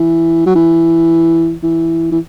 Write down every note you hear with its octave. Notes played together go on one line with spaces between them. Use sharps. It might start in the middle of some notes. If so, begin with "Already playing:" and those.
Already playing: E3
F#3
E3
E3
E3